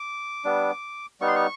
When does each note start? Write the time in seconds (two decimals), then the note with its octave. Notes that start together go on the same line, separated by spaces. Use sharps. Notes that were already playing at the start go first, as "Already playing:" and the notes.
Already playing: D6
0.45 G3 B3 D4
1.21 G3 B3 D#4 C#6
1.28 C6
1.36 C#6